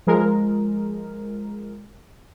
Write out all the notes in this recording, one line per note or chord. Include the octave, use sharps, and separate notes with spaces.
F3 G#3 A#4